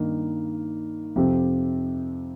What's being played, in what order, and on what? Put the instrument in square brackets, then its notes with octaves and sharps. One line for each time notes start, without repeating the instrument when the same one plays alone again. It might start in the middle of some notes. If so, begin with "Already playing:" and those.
Already playing: [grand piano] G2 D#3 A#3 D#4
F2 C3 F3 C4 G4